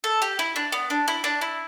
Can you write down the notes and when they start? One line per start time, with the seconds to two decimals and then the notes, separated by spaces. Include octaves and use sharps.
0.04 A4
0.22 G4
0.39 E4
0.56 D4
0.72 B3
0.90 D4
1.08 E4
1.24 D4
1.41 E4